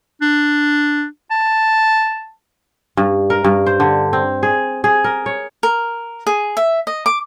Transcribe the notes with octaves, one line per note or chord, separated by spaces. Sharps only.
D4
A5
G2
A#4
G2
C5
D3
C4
G#4
G#4
A#4
C#5
A#4
G#4
E5
D#5
D6